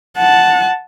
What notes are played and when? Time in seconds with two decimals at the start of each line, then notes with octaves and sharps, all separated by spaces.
0.17 F#5 A5